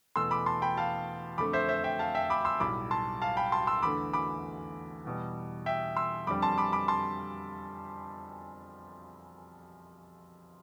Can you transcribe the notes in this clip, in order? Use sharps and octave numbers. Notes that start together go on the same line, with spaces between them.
E2 B2 A3 C6 E6
B5 D6
A5 C6
G5 B5
F5 A5
F2 D3 A3 B5 D6
C5 E5
C5 E5
E5 G5
F5 A5
E5 G5
B5 D6
C6 E6
B1 A2 G3 B5 D6
A5 C6
F5 A5
G5 B5
A5 C6
C6 E6
E2 D3 A3 B5 D6
B5 D6
E2 B2 G3
E5 G5
C6 E6
F2 D3 G3 B5 D6
A5 C6
B5 D6
B5 D6
A5 C6